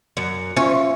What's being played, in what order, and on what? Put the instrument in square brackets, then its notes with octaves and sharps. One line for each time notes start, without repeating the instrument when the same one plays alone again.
[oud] F#2 [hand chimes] C#7
[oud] C#4 [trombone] F4 [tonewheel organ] C5 C#6 [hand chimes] E5